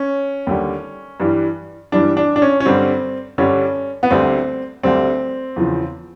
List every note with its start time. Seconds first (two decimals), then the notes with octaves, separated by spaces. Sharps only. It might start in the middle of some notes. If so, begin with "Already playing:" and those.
Already playing: C#4
0.47 D#2 D3 G3
1.20 G2 E3 G3
1.92 G2 E3 G3 D4
2.17 D4
2.36 D4
2.42 C#4
2.60 C#4
2.66 G2 D3 G3 C4
3.38 G2 D3 G3 C#4
4.03 B3
4.10 D2 D3 G3 C4
4.83 D2 D3 G3 C4
5.56 E2 C#3 F3